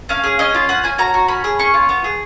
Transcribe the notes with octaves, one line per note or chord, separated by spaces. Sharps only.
C#4 F5
G#4
C#4 D#5
F4
C#4 F#5
C#4 G#5
F#4 A#5
F#4
C#4 B5
G#4
C#4 C#6
F4
B3
G#4